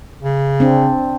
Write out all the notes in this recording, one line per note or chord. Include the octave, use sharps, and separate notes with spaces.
C#3
C4 D4